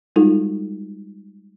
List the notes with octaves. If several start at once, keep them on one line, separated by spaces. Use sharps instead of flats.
G3 G#3 D#4 F4 F#4 A4